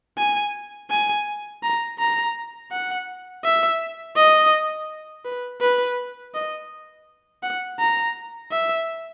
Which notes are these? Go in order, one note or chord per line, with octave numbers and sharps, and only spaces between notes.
G#5
G#5
A#5
A#5
F#5
E5
D#5
B4
B4
D#5
F#5
A#5
E5